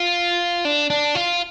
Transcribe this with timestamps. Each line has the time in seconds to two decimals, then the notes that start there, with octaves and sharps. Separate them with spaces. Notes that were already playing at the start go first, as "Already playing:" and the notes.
Already playing: F4
0.65 D4
0.90 D4
1.15 F4